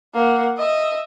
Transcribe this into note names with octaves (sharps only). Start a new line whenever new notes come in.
A#3 F#5
D#5 E5